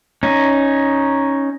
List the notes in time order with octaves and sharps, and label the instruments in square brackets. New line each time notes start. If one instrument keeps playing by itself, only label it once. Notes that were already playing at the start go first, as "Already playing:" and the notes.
[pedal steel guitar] C#4 D#4